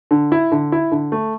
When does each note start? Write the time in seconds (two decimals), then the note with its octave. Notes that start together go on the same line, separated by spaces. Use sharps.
0.11 D3
0.32 E4
0.52 D3
0.72 E4
0.92 D3
1.12 A3